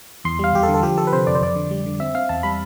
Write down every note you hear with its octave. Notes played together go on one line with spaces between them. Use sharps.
E2 C6
G3 F5
E2 G4
A4
D3
A4
F3 G4
F3 A4
B4
C3 C5
F2 D5
C5
F2 D5
D3
G3
D3
C4 E5
C4 F5
E2 A5
G3 B5